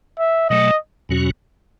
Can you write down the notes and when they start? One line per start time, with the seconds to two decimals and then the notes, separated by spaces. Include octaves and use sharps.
0.19 E5
0.49 B2 F#3 A3 D#5
1.09 E2 B2 F#3 C#4 F#4